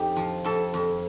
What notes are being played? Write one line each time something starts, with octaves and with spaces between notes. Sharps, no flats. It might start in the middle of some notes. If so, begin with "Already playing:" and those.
Already playing: F2 D#4 G4
F3
F2 A4
F2